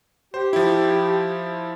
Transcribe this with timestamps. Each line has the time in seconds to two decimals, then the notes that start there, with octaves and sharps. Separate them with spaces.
0.34 G4 C5
0.53 F3 E4